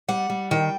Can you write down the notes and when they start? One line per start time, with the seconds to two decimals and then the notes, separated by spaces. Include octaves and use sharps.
0.08 G3 F#5
0.30 G3
0.51 D#3 G5